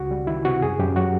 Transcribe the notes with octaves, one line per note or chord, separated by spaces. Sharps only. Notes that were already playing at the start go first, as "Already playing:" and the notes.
Already playing: C#2 C#3 F#4
G3
D#3 E4
C3 F#4
F#2 G#4
F#2 G4
F#3 F#4